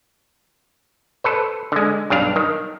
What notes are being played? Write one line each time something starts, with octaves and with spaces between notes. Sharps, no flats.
A4 B4 C5
D3 G#3
B1 G2 D4 F5
D#3